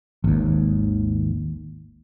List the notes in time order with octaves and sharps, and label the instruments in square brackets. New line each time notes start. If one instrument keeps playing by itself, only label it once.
[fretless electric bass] G#1 D#2